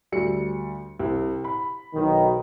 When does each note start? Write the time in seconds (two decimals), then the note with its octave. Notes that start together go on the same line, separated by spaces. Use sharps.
0.12 D2 G3 C#7
1.00 C2
1.44 B5
1.95 B1 D#3